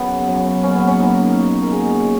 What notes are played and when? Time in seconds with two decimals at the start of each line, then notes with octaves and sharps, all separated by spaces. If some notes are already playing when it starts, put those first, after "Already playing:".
Already playing: F#2 C#3 F#3 B3
0.27 F#2 C#3 F#3
0.64 B2 A#3 C#4
0.75 B3
0.87 C#4
0.99 B2 A#3 D#4
1.36 B2 A#3
1.62 A#4
1.72 B2 A#3 G#4